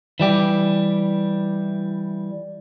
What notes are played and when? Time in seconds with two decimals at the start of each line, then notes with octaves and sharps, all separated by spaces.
0.20 E3 G3 G4